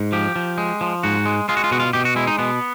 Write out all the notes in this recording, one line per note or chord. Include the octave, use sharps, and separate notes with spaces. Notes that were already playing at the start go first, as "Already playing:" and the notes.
Already playing: G#2
F3 G4
F3
G#3
F3
G#2 F#4
G#3
G#3 F4
F#4
F4
B2 F#4
F4
B2 G4
F#4
G#3 E4
D#4
B2 B3